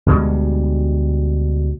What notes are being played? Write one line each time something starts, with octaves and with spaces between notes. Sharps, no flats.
D2 B2 G3 G#3